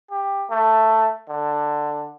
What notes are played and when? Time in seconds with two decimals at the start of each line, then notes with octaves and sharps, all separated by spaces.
0.11 G4
0.51 A3
1.29 D3